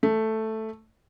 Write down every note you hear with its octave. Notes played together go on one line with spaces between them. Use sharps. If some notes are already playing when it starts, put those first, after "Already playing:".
A3